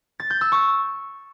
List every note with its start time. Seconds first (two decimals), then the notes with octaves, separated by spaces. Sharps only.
0.20 A6
0.30 G6
0.41 E6
0.52 C#6